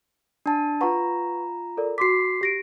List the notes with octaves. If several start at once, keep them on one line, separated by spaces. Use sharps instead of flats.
D4 A5
F4 B4 F#5 A#5 C#6
A4 A#4 D5
F#4 C6 D6 B6 C7
G4 A#6 D7